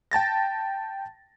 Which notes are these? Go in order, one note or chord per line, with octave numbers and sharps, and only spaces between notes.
G5 A5 A6 A#6